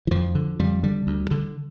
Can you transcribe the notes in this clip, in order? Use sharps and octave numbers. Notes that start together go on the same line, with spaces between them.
E3
F2 F3
D3
F2 G3
D3 G3
D2
D3